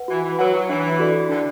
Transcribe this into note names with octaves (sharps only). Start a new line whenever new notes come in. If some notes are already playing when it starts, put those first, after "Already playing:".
Already playing: B4 F#5
E3 F#4
E3
F#3 B4 F#5
F#3
E3 D4
F#4 A4 D5
D3 D4